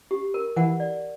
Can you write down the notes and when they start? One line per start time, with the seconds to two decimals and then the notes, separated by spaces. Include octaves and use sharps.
0.11 G4
0.34 A#4
0.56 E3 F#5
0.80 D5